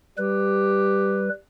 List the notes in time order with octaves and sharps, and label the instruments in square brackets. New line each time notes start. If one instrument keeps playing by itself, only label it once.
[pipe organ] G3 B4 [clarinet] G4